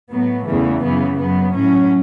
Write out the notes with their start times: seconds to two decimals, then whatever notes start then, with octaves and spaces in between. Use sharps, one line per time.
0.12 A2 F#3 B3
0.48 E2 C#3 E3 A3
0.84 F#2 C#3 E3 B3
1.20 F#2 F#3 B3
1.56 A2 F#3 C#4